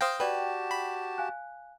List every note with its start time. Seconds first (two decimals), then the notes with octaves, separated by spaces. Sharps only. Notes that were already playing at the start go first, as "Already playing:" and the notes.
0.01 C5 F5 G5 D#6 A#6
0.20 F#4 G4 B4 D5 G5 A5
0.71 B5
1.18 F5 G#5 F#6